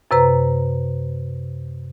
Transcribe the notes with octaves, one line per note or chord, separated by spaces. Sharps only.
F#2 C3 B4 A#5